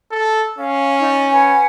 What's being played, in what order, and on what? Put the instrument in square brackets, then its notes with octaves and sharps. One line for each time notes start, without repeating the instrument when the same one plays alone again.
[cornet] A4
[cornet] C#4 [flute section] F5
[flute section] D#4 D5
B4 F#5 G#5